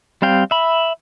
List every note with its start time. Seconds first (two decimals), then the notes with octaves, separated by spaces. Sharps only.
0.22 G3 C4 F5 G5
0.51 E5 B5